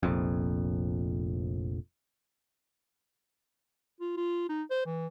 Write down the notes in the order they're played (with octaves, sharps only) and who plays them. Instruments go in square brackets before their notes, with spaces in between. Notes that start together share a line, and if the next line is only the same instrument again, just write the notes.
[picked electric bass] F1 A#1 F2
[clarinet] F4
F4
D#4
C5
E3